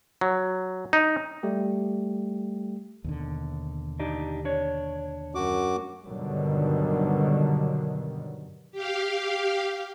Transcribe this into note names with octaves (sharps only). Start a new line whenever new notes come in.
F#3
D#4
G3 A3 G4
D#2 B2 D3
D4 D#4 G4
D4 C#5
F#2 F#4 D6
G2 B2 D3 D#3 F#3 G3
G4 F5